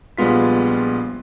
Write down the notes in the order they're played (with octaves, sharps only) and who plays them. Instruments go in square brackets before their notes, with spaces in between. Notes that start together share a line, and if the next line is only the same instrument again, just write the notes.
[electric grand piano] A#1 G3 G#3 B3 F4 B6